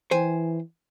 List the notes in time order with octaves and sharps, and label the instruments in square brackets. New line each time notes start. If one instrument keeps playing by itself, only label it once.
[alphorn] E3 [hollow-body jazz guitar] C5 G5 G#5